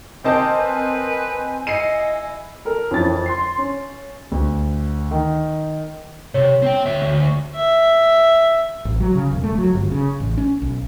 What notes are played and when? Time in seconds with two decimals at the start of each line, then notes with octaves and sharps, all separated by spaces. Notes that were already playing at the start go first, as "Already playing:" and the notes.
0.24 C4 G4 A#4 D#5 G#5 A5
0.58 B4
1.67 E4 D#5 C7 C#7 D#7
2.65 A4 A#4
2.91 F2 E3 C#4 A6
3.26 C6 C7
3.58 C#4
4.32 D2
5.11 D#3
6.34 C3 C#5
6.62 C4 G5
6.86 D2 E5
7.02 D2
7.55 E5
8.85 A1
9.00 F#3
9.15 C#3
9.31 E1
9.44 A3
9.58 F#3
9.73 G1
9.92 C#3
10.20 A1
10.38 C#4
10.62 B1